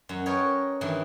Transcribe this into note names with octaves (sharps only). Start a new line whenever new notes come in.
F#2
A#4 B4 C#5 D#5 G5
G2 D#3 E3